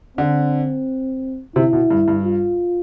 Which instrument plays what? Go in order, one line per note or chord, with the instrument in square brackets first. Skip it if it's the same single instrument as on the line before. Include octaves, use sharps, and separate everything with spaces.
[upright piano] D3 [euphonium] C4
[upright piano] C3 [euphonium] E4
[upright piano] B2
G2
G2
[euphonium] F4